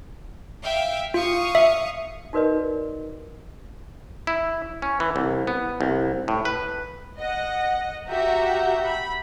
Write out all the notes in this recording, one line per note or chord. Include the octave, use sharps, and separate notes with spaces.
E5 F5 G5
F4 F5 C#6 D#6
E5
D#4 F#4 A#4 B4 D5 D#5
E4
C#4
E3
C2
B3
C2
A2
B4
D#5 F#5
F#4 G4 E5 A#5 G6
B5